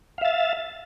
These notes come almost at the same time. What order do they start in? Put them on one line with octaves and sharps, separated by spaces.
F5 E5 A6